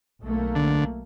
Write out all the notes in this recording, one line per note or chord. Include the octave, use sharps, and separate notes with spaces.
B1 A3 A#3
D3